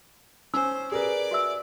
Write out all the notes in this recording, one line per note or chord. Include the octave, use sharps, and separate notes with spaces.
C#4 C5 G#5 E6
G#4 A#4 B4 D5 D6
F#4 E5 E6